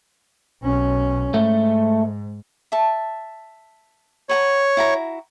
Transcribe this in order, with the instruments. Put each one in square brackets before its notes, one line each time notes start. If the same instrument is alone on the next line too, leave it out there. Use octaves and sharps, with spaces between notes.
[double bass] B1 C#4
[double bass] G#2 [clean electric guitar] A3
[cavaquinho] E5 A5
[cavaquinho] B4 F#5 A#5 [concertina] C#5
[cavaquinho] E4 F#4 A#5